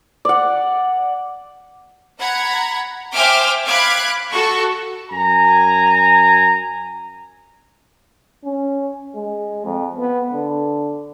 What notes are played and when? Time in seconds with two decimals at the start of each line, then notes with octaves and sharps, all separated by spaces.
0.25 D5 F#5
2.20 F#5 A#5 B5 G#6
3.14 C5 E5 G5 G#5 D6 F6
3.66 F5 B5 D6 F#6 G#6
4.31 F#4 A4 C#6
5.11 F#2 G#5 A#5
8.44 C#4
9.15 G#3
9.65 F2
9.96 B3
10.32 D3